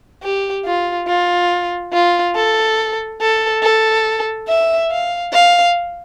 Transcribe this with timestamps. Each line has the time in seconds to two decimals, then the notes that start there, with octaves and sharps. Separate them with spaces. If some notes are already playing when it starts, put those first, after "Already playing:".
0.23 G4
0.66 F4
1.08 F4
1.93 F4
2.35 A4
3.21 A4
3.63 A4
4.48 E5
4.91 F5
5.33 F5